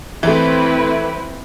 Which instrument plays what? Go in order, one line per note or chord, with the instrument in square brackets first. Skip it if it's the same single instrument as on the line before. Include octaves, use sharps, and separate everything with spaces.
[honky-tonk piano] E3 A3 [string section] C4 E4 B4